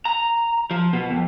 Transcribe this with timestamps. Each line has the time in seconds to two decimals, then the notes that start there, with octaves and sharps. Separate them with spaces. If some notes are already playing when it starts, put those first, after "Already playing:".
0.05 A#5
0.71 F3
0.93 B2
1.10 F2